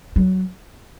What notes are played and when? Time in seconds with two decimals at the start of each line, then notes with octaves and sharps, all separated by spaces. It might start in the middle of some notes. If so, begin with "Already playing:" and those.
0.16 F#3